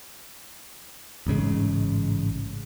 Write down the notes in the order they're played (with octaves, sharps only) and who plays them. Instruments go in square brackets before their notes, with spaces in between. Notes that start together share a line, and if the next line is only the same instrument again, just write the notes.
[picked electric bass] A1 G#2 C#3 G#3